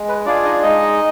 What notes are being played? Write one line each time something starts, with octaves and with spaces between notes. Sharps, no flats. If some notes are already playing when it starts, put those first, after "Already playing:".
Already playing: G#3
B4
D4 F4 G#4 D5
D#4 D#5
G#3 D#4 D#5